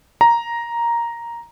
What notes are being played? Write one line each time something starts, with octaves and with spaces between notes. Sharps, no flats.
A#5